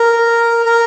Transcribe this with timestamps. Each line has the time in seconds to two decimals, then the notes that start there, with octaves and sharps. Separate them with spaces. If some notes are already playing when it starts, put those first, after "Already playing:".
Already playing: A#4
0.66 A#4